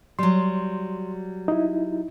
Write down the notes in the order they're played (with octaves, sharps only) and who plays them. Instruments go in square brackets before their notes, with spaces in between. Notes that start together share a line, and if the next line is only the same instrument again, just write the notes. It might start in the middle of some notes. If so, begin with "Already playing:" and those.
[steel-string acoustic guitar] F#3 G3 [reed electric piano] C6
[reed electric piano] D#4 E4